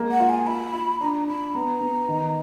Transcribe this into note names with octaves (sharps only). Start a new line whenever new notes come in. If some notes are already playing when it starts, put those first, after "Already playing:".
Already playing: G#3 A#3
F#5
F4
G#5
F4 B5
F4
D4 A#5
D4 B5
B3 A#5
B3
D#3